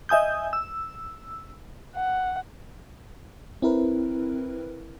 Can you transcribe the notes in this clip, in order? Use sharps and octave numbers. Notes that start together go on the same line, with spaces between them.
D#5 E5 G#5 D#6 G6
E6
F#5
C4 E4 A#4 B4